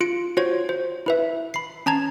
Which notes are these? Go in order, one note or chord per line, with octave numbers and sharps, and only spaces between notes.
F4 C#7 D7
F4 F#4 C5 C#5 G#6
C5
E4 B4 E5
B5 C7
C#4 A5 A#5 G#6